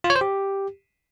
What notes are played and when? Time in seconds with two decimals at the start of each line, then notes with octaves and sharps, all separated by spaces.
0.04 F4
0.10 C#5
0.16 C5
0.21 G4